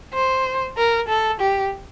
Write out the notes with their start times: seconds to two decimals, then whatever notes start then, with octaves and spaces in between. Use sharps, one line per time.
0.14 C5
0.78 A#4
1.09 A4
1.40 G4